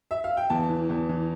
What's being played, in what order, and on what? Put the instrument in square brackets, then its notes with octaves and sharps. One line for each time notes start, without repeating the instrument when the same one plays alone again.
[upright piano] E5
F5
G5
E2 A5
E3
E2
E3